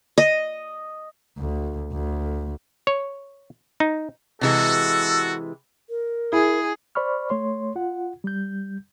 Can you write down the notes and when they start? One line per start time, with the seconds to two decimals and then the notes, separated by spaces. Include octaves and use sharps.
0.18 D#5
1.39 D2
1.93 D2
2.87 C#5
3.80 D#4
4.41 C3 E3 G#3 F#4 A4
5.90 A#4
6.32 E4 G#4
6.95 C5 D5 B5 C#6 F6
7.30 A3 C#5 C6
7.76 F4 F#5
8.24 G3 G6